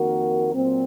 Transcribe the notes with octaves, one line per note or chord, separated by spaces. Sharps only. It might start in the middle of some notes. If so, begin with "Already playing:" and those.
Already playing: F2 D#3 A#3 F#4 A#4
A#2 F#3 C4